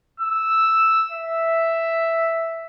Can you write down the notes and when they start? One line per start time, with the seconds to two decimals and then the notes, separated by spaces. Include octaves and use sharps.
0.20 E6
1.11 E5